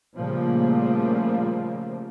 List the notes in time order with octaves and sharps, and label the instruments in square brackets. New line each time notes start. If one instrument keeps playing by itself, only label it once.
[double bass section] A#2 C#3 F3 G3 A3 A#3